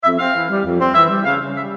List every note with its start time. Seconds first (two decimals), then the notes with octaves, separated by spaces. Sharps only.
0.04 F2 E5
0.19 C4 F5
0.35 E3
0.50 G3
0.65 F2
0.80 C4
0.95 E3 E5
1.10 G3
1.25 C#3 F5
1.40 C#3
1.56 G3 E5